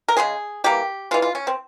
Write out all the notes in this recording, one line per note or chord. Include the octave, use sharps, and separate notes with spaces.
A#4
C#3 F3 G#3 G#4
E3 G3 A#3 G4
E3 G#3 F4
F4
C#4
C4